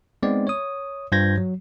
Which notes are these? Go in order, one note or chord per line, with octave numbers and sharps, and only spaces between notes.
G#3 B3 C4 D#4 D5
C#5 D#6
G2 F4 C5 G6 G#6 A#6
F#3